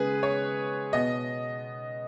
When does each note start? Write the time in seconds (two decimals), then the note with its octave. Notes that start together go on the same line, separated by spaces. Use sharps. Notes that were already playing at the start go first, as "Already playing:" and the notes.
Already playing: C#3 G#3 B3 G#4 B4
0.23 C#5
0.93 B2 B3 D#5